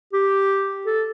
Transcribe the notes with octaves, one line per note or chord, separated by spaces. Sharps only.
G4
A4